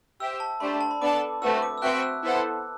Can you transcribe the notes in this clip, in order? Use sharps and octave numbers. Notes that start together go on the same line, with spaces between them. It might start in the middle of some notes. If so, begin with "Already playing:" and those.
G4 C5 E5 G5 E6
A5
A3 D4 G4 C5 B5
A5
B5
B3 D4 A4 D5 A5 D6
A3 C4 F#4 B4 E6
D6
E6
C4 F#4 B4 E5 G5 F#6
E6
B3 E4 A4 C5 F#5